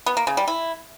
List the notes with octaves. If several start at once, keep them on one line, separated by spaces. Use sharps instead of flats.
B3
A#3
C#3
G3
E4